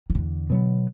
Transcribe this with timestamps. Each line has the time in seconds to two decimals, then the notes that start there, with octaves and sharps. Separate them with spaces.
0.10 D#3
0.15 E2 D3
0.50 B2 F#3 B3